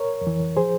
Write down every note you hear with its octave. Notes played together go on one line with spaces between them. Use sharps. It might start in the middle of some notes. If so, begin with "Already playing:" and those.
Already playing: A#4 C#5
F2
E3
F3 G#4 C5